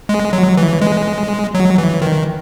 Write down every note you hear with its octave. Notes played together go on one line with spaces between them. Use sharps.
G#3
F#3
E3
G#3
F#3
E3
D#3